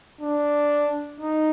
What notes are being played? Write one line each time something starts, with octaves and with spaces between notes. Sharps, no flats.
D4
D#4